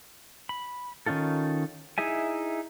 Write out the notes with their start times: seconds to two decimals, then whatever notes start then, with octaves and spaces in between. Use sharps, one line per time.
0.49 B5
1.06 D#3 C#4 D#4 F4 A4
1.98 D#4 E4 G#4 E5 G#5